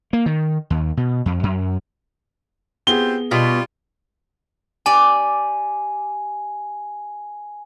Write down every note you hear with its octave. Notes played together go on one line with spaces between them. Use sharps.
A#3
D#3
D#2
B2
F2
F#2
B3 C4 F4 G4 G#4 G7
B2 G3 F4
G4 D5 G#5